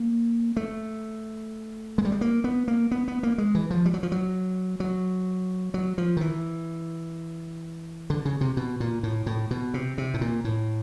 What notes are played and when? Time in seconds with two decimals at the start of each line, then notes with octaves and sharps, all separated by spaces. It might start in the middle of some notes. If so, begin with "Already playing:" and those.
Already playing: A#3
0.57 A3
1.98 G#3
2.05 G3
2.12 G#3
2.21 A#3
2.44 B3
2.68 A#3
2.91 B3
3.08 B3
3.23 A#3
3.38 G#3
3.55 E3
3.70 F3
3.86 G3
3.94 F#3
4.03 F3
4.12 F#3
4.80 F#3
5.74 F#3
5.98 F3
6.17 D#3
6.21 E3
8.10 D3
8.25 C#3
8.41 C3
8.57 B2
8.80 A#2
9.03 A2
9.26 A2
9.51 B2
9.74 C3
9.98 C3
10.14 A2
10.21 A#2
10.44 A2